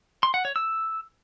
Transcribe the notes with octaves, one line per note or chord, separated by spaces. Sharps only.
C6
F#5
C#5
E6